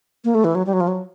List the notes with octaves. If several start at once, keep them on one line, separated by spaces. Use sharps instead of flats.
A#3
A3
E3
F#3
G3
F#3
F3
F#3